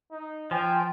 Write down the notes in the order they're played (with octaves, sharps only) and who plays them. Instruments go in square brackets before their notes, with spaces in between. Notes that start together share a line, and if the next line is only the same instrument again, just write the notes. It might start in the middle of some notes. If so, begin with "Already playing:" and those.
[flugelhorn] D#4
[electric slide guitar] F3 [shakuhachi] G5 [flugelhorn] G#5